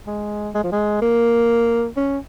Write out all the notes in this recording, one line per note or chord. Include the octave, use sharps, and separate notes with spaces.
G#3
G#3
F3
G#3
A#3
C#4